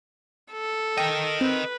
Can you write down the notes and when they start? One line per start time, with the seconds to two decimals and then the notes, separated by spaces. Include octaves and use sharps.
0.52 A4
0.97 A#4 D#5 G5
1.41 C4 B4